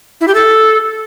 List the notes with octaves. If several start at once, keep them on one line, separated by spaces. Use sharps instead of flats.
E4
G4
A4